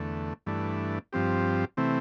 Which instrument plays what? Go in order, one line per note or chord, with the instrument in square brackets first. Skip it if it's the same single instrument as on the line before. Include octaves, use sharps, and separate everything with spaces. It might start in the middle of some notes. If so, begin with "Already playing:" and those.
Already playing: [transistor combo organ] E2 D3 A3
G2 E3 A3 D4
G2 F3 C4 G4
C3 E3 A3 C4